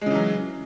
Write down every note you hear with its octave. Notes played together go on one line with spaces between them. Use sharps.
C#3 E3 F#3 G#3